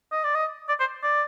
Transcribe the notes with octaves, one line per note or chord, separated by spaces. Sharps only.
D#5
D5
D#5
D5
C5
D5